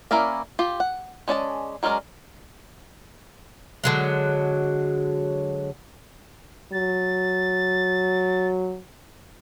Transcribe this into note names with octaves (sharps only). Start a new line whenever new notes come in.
A#3 C#4 E4 A#4 D5
F4 G4
F#5
G#3 C#4 D5 A5
F#3 G#3 C#4 A#4 D5
D3 F#3 G#3
F#3 A6